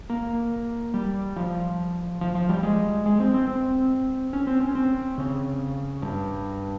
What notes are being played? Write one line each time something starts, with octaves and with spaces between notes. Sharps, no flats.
A#3
G3
F3
F3
F3
G3
G#3
G#3
C4
C4
C4
C#4
C4
C#4
C4
C#3
G2